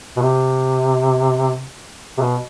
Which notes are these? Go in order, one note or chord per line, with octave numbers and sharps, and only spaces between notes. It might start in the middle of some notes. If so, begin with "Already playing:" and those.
B2
C3
C3
B2